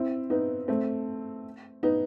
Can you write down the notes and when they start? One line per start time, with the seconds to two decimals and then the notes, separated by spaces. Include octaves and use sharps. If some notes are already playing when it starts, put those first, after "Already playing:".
Already playing: C4 E4
0.30 B3 D#4
0.68 A3 C4
1.83 B3 D#4